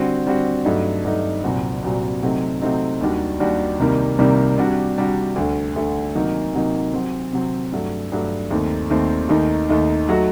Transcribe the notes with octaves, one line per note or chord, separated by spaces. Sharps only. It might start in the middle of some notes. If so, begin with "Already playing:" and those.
Already playing: D3 G3 C4 F#4
D3 G3 C4 F#4
G2 F#3 A3 D#4
G2 F#3 A3 D#4
C2 A#2 F#3 C4 F#4
C2 A#2 F#3 C4 F#4
C3 F#3 A3 C4 D#4
C3 F#3 A3 C4 D#4
D#2 D#3 G3 D4 F#4
D#2 D#3 G3 D4 F#4
C2 C3 D#3 G3 A#3
C2 C3 D#3 G3 A#3
C3 G3 D4 F#4
C3 G3 D4 F#4
D2 D3 A3
D2 D3 A3
C3 D#3 F#3 A#3 D#4
C3 D#3 F#3 A#3 D#4
C3 F#3 C4
C3 F#3 C4
G2 F#3 A3
G2 F#3 A3
D#2 D#3 A3 C4
D#2 D#3 A3 C4
D#2 D#3 A3 D#4
D#2 D#3 A3 D#4
F#3 A3 D#4 F#4